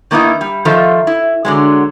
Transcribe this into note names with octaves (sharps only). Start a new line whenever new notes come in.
D#3 A#3 B3 D#4 E4
G3
D#3 F3 F4 A4 C5 E5
E4
D3 F#3 G#3